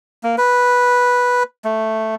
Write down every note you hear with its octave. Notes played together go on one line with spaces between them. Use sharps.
A#3
B4
A3